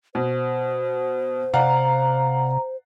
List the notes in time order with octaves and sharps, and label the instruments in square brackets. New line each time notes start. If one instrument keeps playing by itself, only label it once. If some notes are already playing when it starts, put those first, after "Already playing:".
[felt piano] B2 [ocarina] C5
[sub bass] C3 [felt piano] D5 F5 F#5 [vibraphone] A#5